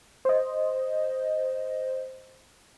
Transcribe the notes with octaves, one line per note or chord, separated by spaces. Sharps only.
C5 D#5